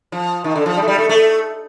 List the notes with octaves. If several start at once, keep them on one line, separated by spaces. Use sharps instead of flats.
F3
D#3
D3
F3
G3
A3
G3
A3
A3